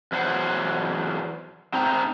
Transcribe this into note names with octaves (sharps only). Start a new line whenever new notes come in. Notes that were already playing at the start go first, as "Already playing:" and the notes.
E2 F#3 C5 F#5
C4 D#4 C5 A#5